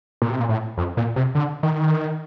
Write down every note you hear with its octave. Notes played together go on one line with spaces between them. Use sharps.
A#2
C3
A#2
A2
F2
A#2
C3
D3
D#3